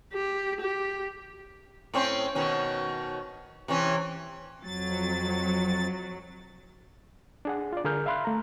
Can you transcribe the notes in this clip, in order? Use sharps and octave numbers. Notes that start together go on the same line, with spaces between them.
G4
G4
A2 C4 C#4
B2 D#3 C#4
C3 E3 C#4
F2 F#3 A6
D4 G#4 F#5
F4 D5
D3 G#4 A#4 F6 G6
E5 F5 B5 C6 F#6
A3 A#5